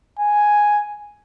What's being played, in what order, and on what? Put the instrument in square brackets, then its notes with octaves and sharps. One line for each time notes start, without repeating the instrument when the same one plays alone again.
[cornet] G#5